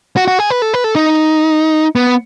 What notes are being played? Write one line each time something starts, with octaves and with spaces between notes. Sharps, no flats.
F#4
F#4
G#4
B4
A4
B4
A4
D#4
B3